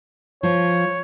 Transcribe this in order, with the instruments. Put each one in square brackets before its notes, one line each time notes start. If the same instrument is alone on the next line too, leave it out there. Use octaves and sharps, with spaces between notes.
[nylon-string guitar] F3 [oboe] C#5